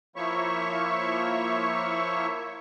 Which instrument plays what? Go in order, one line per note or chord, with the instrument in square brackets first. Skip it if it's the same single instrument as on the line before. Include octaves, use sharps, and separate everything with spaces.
[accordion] F3 A#3 E4 C#5 E5 C#6